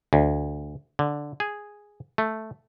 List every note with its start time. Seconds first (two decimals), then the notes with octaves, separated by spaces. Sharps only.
0.13 D2
0.99 D3
1.40 G#4
2.18 A3